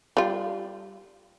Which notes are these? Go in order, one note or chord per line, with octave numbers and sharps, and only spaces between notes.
G3 F4